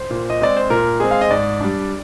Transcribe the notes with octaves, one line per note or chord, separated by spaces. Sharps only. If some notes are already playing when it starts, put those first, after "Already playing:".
Already playing: C5
A#2
D#5
G#3 C4 D5
C5
A#2 A#4
G#3 C4 G#4
F5
D#5
G#2 D5
G3 D4